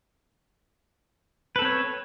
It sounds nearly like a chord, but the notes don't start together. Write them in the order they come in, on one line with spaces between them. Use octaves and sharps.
B4 A4 C4 C#5